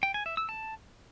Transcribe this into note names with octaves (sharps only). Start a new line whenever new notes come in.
G5
G#5
E5
E6
A5